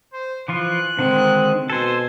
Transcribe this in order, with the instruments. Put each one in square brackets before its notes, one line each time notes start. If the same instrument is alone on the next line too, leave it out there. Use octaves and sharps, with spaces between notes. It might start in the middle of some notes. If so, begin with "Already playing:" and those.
[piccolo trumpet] C5
[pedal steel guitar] E3 F3 F4 [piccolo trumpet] F#6
[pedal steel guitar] D3 D#3 G#3 [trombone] C4
[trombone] B2 [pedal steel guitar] A4 C5 [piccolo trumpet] G#5